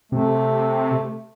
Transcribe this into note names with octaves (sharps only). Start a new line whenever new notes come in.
C3 A3